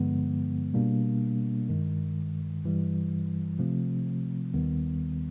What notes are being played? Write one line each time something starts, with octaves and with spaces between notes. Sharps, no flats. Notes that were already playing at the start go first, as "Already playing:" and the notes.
Already playing: G2 D3 F3 G#3 B3
B2 G3 A#3 D4
G2 D#3 G#3
G2 E3 G3
C3 F3 A3 C4
D#2 D#3 G3 B3